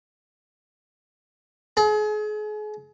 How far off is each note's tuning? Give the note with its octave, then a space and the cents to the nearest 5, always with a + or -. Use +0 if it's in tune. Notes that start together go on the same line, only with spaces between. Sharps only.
G#4 +35